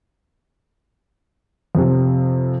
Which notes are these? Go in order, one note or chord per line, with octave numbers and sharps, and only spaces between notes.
F2 C3